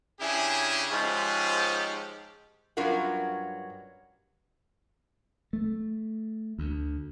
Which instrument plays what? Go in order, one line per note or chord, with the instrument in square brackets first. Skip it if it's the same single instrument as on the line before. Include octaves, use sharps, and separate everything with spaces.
[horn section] C#3 C#4 D4 E4 G4 G#4
G#2 F3 G#3 C#4 D#4 G4
[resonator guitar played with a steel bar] G2 F#3 C#4 F4 A#4 F#5
[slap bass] A3
D2